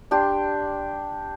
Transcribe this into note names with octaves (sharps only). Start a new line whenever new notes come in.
D4 G4 C6